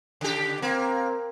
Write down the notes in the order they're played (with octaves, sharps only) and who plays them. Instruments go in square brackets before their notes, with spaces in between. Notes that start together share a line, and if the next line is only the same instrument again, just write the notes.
[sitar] C#3 G4
[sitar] A#3 [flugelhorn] C4